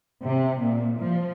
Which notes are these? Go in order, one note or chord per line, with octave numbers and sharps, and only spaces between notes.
C3
A#2
F3